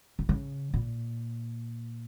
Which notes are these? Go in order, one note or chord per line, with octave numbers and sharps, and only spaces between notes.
B2
C#3
A#2